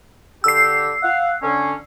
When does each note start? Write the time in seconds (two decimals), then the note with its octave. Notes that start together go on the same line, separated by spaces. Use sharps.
0.44 D3 G4 E6 C7
1.03 F5 F#5
1.42 D3 C#4